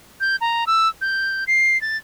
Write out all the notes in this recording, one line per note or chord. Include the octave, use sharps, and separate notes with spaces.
G6
A#5
E6
G6
C7
A6